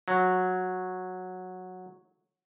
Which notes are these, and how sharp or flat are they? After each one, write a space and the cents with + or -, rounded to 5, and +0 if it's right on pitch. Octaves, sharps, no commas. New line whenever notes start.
F#3 -10